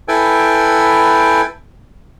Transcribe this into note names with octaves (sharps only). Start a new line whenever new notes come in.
E4 A4 B4 G5 G#5